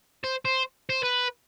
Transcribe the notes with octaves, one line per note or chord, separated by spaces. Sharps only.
C5
C5
C5
B4